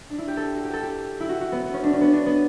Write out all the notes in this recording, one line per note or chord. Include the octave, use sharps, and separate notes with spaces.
D4
E4
G4
A4
F#4
G4
A4
G4
E4
F#4
F#4
B3
B3
C#4
D4
C#4
B3
D4
B3